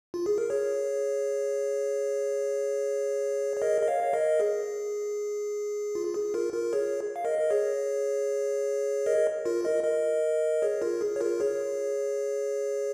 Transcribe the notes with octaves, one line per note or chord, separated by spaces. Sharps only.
F4
G#4
A#4
G#4 C#5
C#5
A#4 D#5
D#5
C#5 F5
C#5
A#4 D#5
G#4
F4
G#4
F4 A#4
F4 A#4
G#4 C#5
F5
A#4 D#5
A#4
G#4 C#5
A#4 D#5
F4 A#4
A#4 D#5
A#4 D#5
G#4 C#5
F4 A#4
G#4
C#5
F4 A#4
G#4 C#5